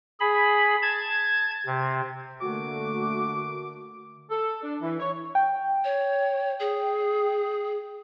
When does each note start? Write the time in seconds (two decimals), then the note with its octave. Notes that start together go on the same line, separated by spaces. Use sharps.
0.20 G#4 B5
0.82 A5 G#6
1.66 C3
2.41 D3 A3 A#3 F#4 D6
4.30 A4
4.62 D4
4.81 E3
5.00 C#5
5.35 G5
5.84 C#5
6.60 G#4